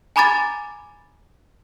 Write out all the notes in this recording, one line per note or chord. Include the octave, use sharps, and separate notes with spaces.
G#5 A#5 B5 D6 G#6 A6